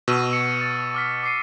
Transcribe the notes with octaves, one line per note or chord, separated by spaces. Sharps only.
B2 C#6 E6 D#7
E6 C#7
A6
D6 F6 B6
D6 C7 D#7